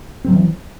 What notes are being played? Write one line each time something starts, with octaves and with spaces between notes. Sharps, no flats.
E3 F#3 C4